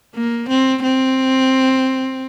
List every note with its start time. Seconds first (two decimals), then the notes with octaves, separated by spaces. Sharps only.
0.15 A#3
0.49 C4
0.83 C4